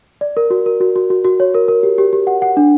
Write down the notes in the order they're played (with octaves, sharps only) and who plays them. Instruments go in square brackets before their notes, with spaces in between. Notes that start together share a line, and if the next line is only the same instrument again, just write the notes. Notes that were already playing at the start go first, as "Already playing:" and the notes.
[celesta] D5
A#4
F#4
A#4
F#4
F#4
F#4
F#4
C#5
A#4
A#4
G4
G4
G4
F#5
F#5
D4